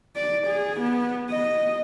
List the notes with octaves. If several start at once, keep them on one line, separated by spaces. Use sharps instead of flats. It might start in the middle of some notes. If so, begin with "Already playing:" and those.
D5
G#4
B3
D#5